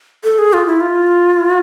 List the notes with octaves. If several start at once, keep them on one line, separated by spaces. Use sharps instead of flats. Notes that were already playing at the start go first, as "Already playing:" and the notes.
A4
G#4
F4
E4
F4